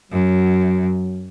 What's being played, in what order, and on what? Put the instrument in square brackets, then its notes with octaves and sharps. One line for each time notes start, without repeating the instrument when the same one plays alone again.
[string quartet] F#2 [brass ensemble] F#3